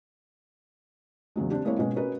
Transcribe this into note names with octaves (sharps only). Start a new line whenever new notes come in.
E2 C#3 F#3 G#3
C4 D4 G4
G#3 A#3 C4 E4 C#5
B2 G#3 C#4
C#4 F#4 A#4 B4 D#5